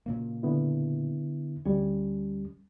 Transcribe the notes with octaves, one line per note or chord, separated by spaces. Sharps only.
A#2 C#3 A#3
D3 B3 E4
D2 G3 C#4